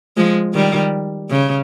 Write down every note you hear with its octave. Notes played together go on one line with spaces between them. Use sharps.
F3 G#3
D#3 G3
C#3